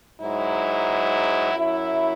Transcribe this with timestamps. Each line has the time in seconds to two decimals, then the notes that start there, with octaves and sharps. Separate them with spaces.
0.19 G#2 F#3 E4
1.53 F#2 F#3 E4